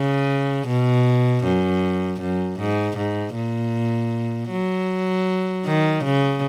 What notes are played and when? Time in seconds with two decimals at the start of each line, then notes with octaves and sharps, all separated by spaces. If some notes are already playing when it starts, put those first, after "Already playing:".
Already playing: C#3
0.67 B2
1.44 F#2
2.20 F#2
2.59 G#2
2.97 G#2
3.35 A#2
4.51 F#3
5.66 D#3
6.04 C#3